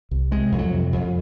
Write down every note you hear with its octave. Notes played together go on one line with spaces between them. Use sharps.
C2
C3 G#3
F2
F#3
C3
F2